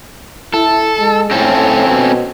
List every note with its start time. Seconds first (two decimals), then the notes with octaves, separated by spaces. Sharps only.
0.54 E4 A4
0.99 G#3
1.31 A2 C4 C#4 A4
1.89 B2